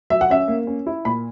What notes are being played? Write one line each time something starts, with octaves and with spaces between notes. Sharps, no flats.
F#3 E5
F#5
C#4 E5
A#3
C#4
E4
A#2 B5